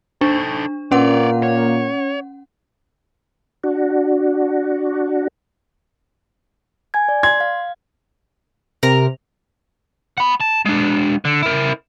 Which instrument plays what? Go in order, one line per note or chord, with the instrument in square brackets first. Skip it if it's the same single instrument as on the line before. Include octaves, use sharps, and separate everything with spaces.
[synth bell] D4 [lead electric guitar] D#4 A4
[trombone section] A#2 A#3 [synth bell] C#4 F#5 [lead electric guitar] C#5 D5
[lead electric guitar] C#5
[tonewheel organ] D4 F#4
[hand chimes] G#5 G#6
D5
[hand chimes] C6 [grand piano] G#6
[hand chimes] F5
[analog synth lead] C3 [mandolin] A#4 A#5
[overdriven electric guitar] F#5 B5
A5
G#3 D4
D3
E4 A#4